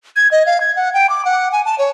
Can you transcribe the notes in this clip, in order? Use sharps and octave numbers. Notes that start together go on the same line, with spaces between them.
G#6
D#5
F5
G#6
F#5
G5
D6
F#5
G#5
A5
C#5